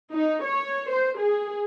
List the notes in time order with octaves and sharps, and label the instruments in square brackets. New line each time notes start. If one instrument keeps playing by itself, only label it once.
[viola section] D#4
C#5
C5
G#4